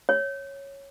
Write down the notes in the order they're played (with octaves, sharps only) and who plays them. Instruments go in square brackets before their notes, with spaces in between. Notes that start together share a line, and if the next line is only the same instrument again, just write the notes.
[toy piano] C#5